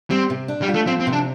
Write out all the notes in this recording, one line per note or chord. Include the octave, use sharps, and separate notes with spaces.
G3 C4
C3
D4
G3
F4
A3
F3 C4
C4
C3
D4